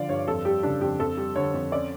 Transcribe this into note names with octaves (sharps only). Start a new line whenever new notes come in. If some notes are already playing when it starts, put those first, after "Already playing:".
Already playing: D3 F3 D5 F5
G2 C#5
F2 A4
G3 G4
C#3 D4
F2 G4
F2 A4
G3
D3 C#5
F2
C#4 D5